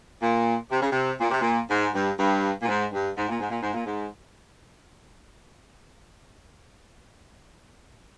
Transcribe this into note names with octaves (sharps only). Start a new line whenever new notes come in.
A#2
C3
C#3
C3
A#2
C3
A#2
G#2
G2
G2
A#2
G#2
G2
G#2
A#2
G#2
A#2
G#2
A#2
G#2